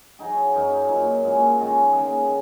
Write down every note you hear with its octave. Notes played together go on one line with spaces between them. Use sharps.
F#3 D#4 G#4
F#2 F#3 D#4 A#4
A#2 F#3 D#4
A#2 G#3 C#4
D#3 G#3 C#4 F#4
C#3 A#3 D#4 G#4
D#3